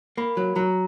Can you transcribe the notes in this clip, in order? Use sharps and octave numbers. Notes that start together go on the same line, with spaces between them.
A#3 B5
F#3
F#3 A#5